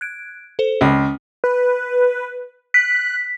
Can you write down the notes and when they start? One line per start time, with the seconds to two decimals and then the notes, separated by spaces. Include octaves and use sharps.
0.01 F#6 G#6 D7
0.59 A4 C5
0.81 C#2 C#4 D#6
1.44 B4
2.74 F#6 B6